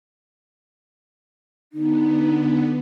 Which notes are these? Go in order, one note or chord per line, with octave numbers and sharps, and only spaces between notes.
D3 B3 D#4